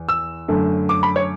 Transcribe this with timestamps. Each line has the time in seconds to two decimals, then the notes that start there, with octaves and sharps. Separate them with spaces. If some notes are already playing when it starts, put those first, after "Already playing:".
Already playing: E2
0.09 E6
0.48 F#2 D3 A3
0.89 D6
1.03 B5
1.16 C#5